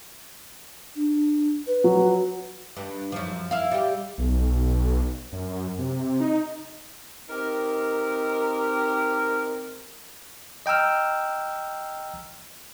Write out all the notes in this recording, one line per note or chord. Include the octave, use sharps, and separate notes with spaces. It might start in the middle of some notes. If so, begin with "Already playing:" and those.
D4
B4
F#3
G2
F#2 F3
E4 F5
G3 G4
B1
F#2
C3
D#4
C4 D#4 G4 A#4
D#5 G5 A#5 E6 F6